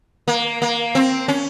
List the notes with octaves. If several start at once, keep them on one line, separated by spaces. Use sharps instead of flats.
A#3
A#3
C4
C#4